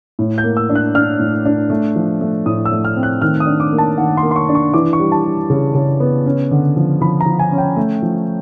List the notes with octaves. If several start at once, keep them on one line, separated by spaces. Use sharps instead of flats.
A2
G6
A#3
E6
D4
F#6
D4 F6
A2
D4
A3
F3
A3
A2 D#6
E6
A3
F6
C4
F#6
D#3 F6
D#6
D4
D6
A#3
A5
D#3 F#5
C6
A#3
C6
C#6
D4
C#6
E3 D6
C#6
G3
A5
G3
C#3
C#3
B3
C#4
D3
F3
F3 B5
A#5
F3
G#5
C#4
G5
A3
F3